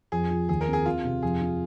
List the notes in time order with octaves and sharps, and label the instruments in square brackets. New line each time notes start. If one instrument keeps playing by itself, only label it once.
[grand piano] F2 [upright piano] G#4
[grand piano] F3
[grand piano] D#2 [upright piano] G#4
[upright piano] A#4
[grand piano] C4
[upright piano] G#4
[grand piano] C4 [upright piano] F4
[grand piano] C3
[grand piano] F2 [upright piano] G#4
[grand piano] F4